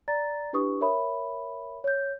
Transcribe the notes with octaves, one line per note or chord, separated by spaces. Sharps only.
D5 A#5 A6
D4 E4 G4 B4 C#6 D#6
A#4 C#5 E5 B5
C#5 G6